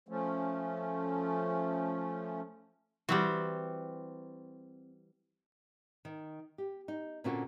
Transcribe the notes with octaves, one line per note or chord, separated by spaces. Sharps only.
F3 A3 C#4
E3 G3 C4 F#4
D#3
G4
D#4
A#2 D3 C4 C#4 F4 F#4